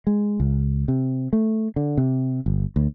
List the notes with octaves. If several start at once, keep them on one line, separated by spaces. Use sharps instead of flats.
G#3
C#2
C3
A3
D3
C3
G1
D2